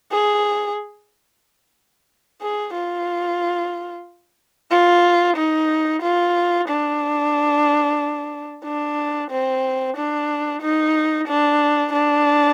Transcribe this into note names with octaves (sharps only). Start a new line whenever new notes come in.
G#4
G#4
F4
F4
D#4
F4
D4
D4
C4
D4
D#4
D4
D4